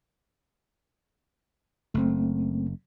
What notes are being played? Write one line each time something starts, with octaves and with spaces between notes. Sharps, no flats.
F#1 A3 C4